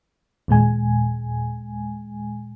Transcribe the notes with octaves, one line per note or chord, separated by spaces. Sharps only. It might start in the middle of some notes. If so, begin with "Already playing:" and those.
D#2 A#2 G#3 G#5